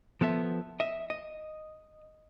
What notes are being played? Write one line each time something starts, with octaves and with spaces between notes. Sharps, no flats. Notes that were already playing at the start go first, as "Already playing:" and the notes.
F3 B3 A4 E5
D#5 E5
D#5